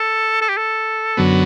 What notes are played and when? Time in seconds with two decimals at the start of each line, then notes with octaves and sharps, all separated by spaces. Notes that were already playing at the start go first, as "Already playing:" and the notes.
Already playing: A4
0.41 A4
0.49 G4
0.57 A4
1.17 F#2 D3 F#3 B3